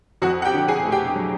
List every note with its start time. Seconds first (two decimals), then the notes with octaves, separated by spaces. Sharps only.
0.22 F2 F#4 F#5
0.42 F#5
0.45 G4 G5
0.54 D3
0.68 G#4 G#5
0.85 A3
0.92 G4 G5
1.16 F#3